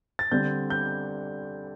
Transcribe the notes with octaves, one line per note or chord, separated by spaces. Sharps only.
A6
D3 G3 C4 G6
G6